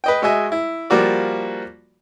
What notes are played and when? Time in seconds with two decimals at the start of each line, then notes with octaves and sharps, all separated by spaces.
0.04 B4 D#5 G5
0.22 G#3 F#4 D#5 E5 G#5
0.52 E4
0.90 F3 G3 A#3 F#4 D5